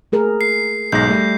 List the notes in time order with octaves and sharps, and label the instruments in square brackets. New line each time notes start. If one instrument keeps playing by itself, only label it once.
[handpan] A3 G#4 A#4
[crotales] C7
[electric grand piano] B1 G#2 A#6 [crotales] G6
[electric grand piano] G3 A3